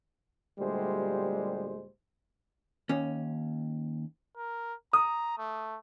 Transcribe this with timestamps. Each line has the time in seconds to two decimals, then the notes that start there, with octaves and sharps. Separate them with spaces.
0.59 D2 A#2 G3 G#3 G4 C5
2.89 D#2 C#4
4.37 A#4
4.93 A#5 D#6
5.38 A3